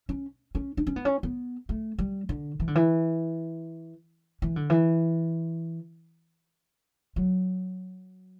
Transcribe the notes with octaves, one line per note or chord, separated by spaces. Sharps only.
C#4
C#4
D4
C#4
B3
C#4
B3
A3
G3
D3
E3
D3
E3
E3
D3
E3
F#3